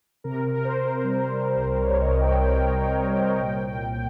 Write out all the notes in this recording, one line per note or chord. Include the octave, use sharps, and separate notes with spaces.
C3 A#4
C3 A#4
C5
C3
G3
G3
C2
C5
G3 C#5
D#5
C2
G5
C3
G5
C2
C2
C2
A#2
A#2
A#2